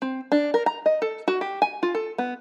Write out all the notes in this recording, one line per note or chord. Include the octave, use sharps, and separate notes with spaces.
C4
D4
A#4
A#5
D#5
A4
F#4
G4
G#5
F4
A4
B3